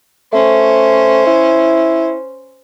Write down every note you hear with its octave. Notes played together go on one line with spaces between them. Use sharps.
A3 C#4 C5
E4